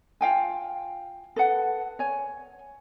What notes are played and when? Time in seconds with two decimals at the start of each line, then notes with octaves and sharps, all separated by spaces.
0.21 F4 F5 G5 G#5
1.36 A4 B4 F#5
1.99 C#5 G#5